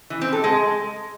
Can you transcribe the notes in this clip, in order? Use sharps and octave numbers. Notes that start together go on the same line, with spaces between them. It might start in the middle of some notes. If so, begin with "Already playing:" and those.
E3
C4
A4
G#3